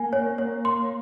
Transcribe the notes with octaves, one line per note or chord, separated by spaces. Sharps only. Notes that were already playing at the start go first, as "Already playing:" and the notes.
Already playing: A#3 G#5
C#5
C#5
C6